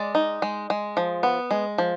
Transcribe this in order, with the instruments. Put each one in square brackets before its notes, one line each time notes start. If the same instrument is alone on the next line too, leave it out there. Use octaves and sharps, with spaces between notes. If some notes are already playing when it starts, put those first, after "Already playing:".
Already playing: [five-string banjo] G#3 D5
D#4
G#3
G#3
F3
B3
G#3
F3